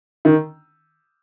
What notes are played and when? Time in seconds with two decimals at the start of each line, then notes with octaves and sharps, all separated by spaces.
0.25 D#3